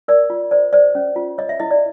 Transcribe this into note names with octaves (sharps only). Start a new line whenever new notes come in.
A#4 D5
F4
C5 D5
C5 D5
C#4
F4
C#5 D#5
E5
E4 D#5
D5